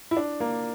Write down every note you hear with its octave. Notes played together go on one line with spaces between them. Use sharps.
E4
D4
A#3